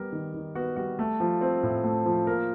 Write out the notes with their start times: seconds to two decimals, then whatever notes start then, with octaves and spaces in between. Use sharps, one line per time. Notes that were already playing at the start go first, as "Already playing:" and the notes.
Already playing: G3 B3 A#4
0.13 D#3
0.34 D#3
0.55 B3 F#4
0.76 G3 F#4
0.99 A3
1.20 F3
1.41 C4
1.63 A2
1.84 A3
2.06 F3
2.27 A#3 A#4